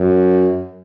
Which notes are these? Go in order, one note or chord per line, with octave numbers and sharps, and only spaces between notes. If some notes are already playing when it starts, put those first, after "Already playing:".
Already playing: F#2